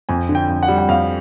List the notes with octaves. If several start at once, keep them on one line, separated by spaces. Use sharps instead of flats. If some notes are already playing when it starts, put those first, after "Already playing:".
F2 G#5
D3
G5
F2
F#5
G3
F#5
F2 F5